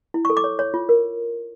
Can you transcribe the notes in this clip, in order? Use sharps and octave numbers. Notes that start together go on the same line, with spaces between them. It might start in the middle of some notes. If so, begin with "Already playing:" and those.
E4
A4 C#6
D6
C#5
C#5
F4
A#4